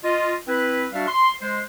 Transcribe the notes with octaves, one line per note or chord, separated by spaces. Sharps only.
F4 D#5
C4 E4 B4
G3 D4 F#4 E5 F5
C6
G#3 C5